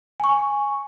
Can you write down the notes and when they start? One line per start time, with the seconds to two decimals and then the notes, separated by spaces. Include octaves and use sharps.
0.20 G#5 C#6